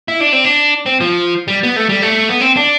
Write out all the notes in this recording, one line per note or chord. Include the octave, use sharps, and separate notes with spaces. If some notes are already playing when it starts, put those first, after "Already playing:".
E4
D4
C4
D4
C4
F3
G3
B3
A3
G3
A3
B3
C4
D4